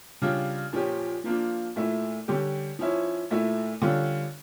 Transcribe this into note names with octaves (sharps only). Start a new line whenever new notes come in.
C#3 G3 D4 F4
A#2 F3 C#4 G4
F3 A#3 D4 F4
A#2 A3 E4
D3 G3 C#4 G4
F3 C#4 E4
A#2 A3 E4
D3 G3 C#4 F4